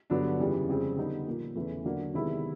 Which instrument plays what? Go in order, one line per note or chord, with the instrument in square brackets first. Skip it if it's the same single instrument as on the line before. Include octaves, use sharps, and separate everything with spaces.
[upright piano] G2 D3 F#3 B3 D4
F2 C#3 E3 G3
F2 C#3 F3 G#3 C4
D3 G3 B3 D#4
A#2 F3 A#3
E2 C#3 E3 A3
D3 F#3 A#3 D4
C3 D#3 G#3 B3 E4